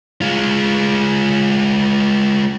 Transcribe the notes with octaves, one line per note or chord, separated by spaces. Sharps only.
G#3 F4